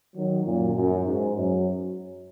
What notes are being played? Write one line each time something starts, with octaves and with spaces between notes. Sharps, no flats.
D#3 F#3
F#2 A#2
F#2
G#2
F#2